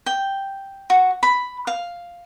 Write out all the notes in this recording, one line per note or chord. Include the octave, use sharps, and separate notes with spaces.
G5
F#4
B5
F5